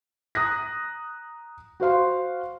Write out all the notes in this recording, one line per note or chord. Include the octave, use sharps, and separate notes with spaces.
A#5 D#6 F#6 A#6
F#4 C5 F5 C6